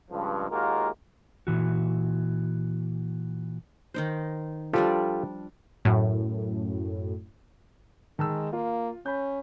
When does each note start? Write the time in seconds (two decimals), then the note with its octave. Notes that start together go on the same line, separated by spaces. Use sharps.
0.11 C#2 G2 F3
0.51 D#2 G#3 A#3 F4 F#4 A#4
1.47 A#2 E3 F#4
3.94 D#3 D#4 C5
4.73 F3 G3 D4 F4 G4 A4
5.85 F#2 A2
8.19 D#3 G#3 A5 E6
8.53 A#3 F4
9.06 C#4 B5 G6